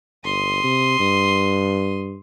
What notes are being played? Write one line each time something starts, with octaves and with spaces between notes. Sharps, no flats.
G1 C6 D#6
C3
G2